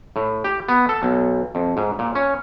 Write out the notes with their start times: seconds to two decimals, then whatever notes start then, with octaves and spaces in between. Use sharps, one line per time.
0.16 A2
0.44 G4
0.69 B3
0.89 A4
1.03 B1
1.55 F2
1.77 G#2
1.99 A#2
2.15 C#4